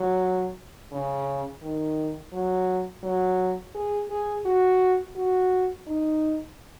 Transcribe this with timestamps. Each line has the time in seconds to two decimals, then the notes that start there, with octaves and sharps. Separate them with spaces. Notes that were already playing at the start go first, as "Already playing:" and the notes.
Already playing: F#3
0.92 C#3
1.62 D#3
2.33 F#3
3.03 F#3
3.75 G#4
4.10 G#4
4.45 F#4
5.16 F#4
5.87 D#4